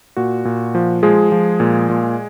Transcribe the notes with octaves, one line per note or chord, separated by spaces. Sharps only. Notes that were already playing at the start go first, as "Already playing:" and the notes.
A#2 F#4
A#2
F3
F3 G#3 G#4
F3
A#2
A#2